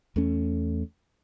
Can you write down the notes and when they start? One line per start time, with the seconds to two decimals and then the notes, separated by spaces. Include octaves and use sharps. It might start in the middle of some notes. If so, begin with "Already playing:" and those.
0.16 E2 A3 C#4